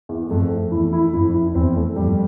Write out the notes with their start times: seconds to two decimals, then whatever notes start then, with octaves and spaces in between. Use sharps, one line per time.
0.09 E2
0.30 F2 A3
0.51 A3
0.71 E2 E4
0.93 E4
1.13 F2 E4
1.34 E4
1.55 E2 C4
1.76 A3
1.96 F2 G3